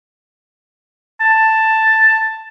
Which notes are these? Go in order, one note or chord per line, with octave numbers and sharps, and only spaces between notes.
A5